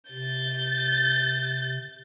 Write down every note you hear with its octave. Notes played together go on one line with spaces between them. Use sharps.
C3 G6 A6